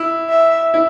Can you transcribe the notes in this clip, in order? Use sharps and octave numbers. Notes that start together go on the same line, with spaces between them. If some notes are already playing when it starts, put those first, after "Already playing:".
Already playing: E4
E5
E4